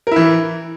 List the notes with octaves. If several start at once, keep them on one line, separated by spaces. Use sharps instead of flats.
E3 E4 A#4